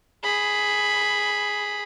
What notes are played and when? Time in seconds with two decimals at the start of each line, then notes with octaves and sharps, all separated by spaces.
0.23 G#4 B5